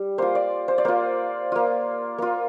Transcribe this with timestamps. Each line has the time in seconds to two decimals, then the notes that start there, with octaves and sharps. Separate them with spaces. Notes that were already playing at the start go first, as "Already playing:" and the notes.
Already playing: G3
0.18 A#3 F4 C5
0.35 D5
0.68 C5
0.78 D5
0.85 A#3 F4 C5
1.52 A#3 F4
2.18 A#3 F4